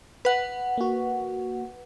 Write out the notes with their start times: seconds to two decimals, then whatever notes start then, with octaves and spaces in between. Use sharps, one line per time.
0.25 B4 F#5
0.78 A#3 F#4